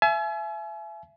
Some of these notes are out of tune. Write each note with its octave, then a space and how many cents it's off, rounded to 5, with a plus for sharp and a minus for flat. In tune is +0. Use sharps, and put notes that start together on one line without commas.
E5 +30 G#5 +40